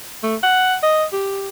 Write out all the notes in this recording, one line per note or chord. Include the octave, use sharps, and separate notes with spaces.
A3
F#5
D#5
G4